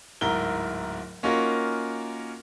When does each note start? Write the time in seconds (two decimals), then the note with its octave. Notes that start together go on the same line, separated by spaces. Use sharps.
0.21 D1 G#2 E4 A#4 G7
1.23 A#3 C#4 D#4 F4 F#4 A#4